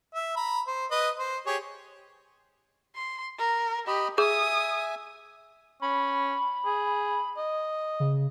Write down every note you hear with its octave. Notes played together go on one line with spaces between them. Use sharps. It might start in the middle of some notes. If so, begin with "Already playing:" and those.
E5
A#5 B5
C5
B4 D#5
C5
G4 G#4 C#5
C6
A#4
G4 D#5 B5
G#4 E5 G#5 D#6
C#4 B5
G#4
D#5
C#3